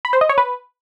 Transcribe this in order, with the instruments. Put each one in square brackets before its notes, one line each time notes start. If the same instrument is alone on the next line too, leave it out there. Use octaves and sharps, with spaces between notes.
[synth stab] B5
C5
D#5
C#5
B4